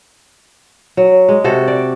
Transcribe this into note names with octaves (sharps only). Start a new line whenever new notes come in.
F#3
G#3
C3 F#4 A4 F#5
D5